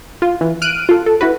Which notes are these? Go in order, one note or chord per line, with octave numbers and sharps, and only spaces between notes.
F4
E3
F6 F#6 D7 D#7
F4 A4
A4
E4 F#4 B4